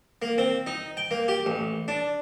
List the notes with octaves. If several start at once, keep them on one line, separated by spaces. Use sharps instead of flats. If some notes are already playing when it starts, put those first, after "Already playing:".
A#3
C4
D#4
G5
A#3
G4
A1
D4